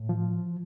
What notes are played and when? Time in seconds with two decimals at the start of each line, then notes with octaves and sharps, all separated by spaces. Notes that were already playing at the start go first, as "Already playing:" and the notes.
Already playing: A2
0.09 F3